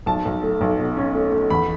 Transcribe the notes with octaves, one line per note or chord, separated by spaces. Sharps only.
B1 A5
B1
A3
B1
B2
C#4
A3
A3
E2 B5